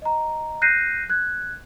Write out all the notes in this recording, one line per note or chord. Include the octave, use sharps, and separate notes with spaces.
D#5 A#5
F#6 G6 A#6 C7 D#7
F#6 G#6